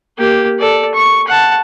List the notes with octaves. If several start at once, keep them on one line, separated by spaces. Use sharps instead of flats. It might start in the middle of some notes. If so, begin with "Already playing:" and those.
A#3 G4
A4 D5
C#6
F#5 A5